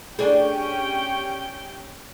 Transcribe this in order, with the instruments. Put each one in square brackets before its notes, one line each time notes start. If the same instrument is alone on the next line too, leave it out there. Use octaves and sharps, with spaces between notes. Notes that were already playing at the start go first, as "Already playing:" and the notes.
[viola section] C#4 G4 G5 [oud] D4 G#4